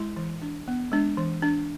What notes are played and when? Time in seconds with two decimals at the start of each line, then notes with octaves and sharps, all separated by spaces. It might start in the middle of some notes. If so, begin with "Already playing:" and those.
Already playing: G#3 E4
0.16 E3
0.42 D4
0.68 B3
0.92 G#3 D4
1.17 E3
1.42 D4